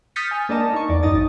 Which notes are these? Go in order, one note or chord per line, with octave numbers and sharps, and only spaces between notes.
D#6 F6 G6 A6 B6 C#7
G#5
A#3 D4 A#4 D#5 A5
D#4 C#6
E2 D5
A1 F#2 D#4 D#5 A6